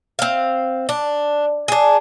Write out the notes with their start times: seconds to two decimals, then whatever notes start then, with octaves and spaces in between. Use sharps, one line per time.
0.19 C4 F5
0.89 D4
1.68 D4 G#4